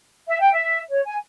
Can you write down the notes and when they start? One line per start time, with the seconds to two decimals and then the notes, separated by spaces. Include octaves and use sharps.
0.27 E5
0.40 G5
0.53 E5
0.90 C#5
1.05 G#5